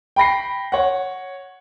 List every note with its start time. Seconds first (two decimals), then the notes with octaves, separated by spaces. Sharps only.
0.16 G5 B5 A#6 C7
0.72 C#5 F#5